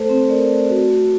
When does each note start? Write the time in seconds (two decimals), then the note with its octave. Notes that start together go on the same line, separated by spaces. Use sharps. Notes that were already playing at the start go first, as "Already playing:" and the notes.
Already playing: A3 A4 C5
0.09 C4
0.29 A3 A#4 D5
0.50 A3
0.69 F#4
0.91 A3